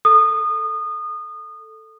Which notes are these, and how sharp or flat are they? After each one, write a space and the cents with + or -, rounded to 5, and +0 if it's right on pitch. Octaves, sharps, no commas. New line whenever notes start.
A4 +0 D#6 -25